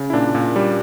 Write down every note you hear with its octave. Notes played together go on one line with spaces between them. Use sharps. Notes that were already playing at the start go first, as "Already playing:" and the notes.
Already playing: C#3
E4
A#2 D4
A#2
G3